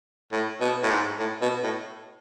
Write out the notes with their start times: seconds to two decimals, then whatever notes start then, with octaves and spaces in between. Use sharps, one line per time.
0.32 A2
0.61 B2
0.83 A2
0.90 G#2
1.19 A2
1.41 B2
1.63 A2